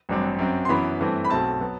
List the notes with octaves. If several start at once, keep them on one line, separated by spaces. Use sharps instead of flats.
A1 G2 F#3 C4
F#2 F#3 C4
C6
F#2 E3 B3 B5
G2 E3 A3 C4
B5
B1 B2 A3 C4 A5
F#3 B3